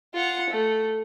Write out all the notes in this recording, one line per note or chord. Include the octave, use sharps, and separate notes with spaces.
F4 F#5
A3